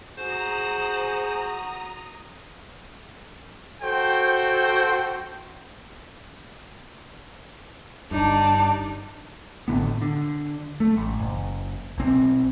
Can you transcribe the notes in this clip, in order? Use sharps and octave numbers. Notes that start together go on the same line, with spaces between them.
F#4 G#4 C5 A#5 D#6
F#4 A4 C5 G5
G1 G2 D4 D#4 A5
G#1 A2 D3 B3
D3
A3
A1
F#1
B1 C4